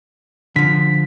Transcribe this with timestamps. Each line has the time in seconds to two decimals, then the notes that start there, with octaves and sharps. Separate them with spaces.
0.56 D3 F3 B6